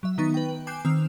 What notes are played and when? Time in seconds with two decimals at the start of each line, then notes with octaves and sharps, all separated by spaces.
0.03 F#3 E5
0.18 D#3 B3 D#4 C#6 A6
0.34 B4 G5
0.67 G#5 D6 F#6 G6 C7 E7
0.85 D#3 C4 E6 F6 F7